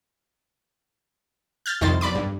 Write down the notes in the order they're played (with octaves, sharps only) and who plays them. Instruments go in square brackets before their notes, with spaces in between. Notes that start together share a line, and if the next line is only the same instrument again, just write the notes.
[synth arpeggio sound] F6 G6 A6
C2 F2 D#3 C5 C6 A6
B1 D5 B5 D6
G2